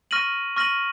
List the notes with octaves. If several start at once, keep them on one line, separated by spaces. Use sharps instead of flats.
C#6 F6 A#6 D#7 F#7
C#6 F6 A#6 D#7 F#7